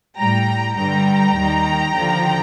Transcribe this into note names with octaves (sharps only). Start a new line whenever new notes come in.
A2 G3 G5 A#5
G2 D3 G3 G5 A#5
D#2 D#3 G3
D#2 D3 F3